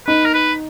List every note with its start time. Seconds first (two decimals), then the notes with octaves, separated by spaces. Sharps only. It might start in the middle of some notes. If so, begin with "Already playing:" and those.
0.07 D#4 B4
0.25 A#4
0.34 B4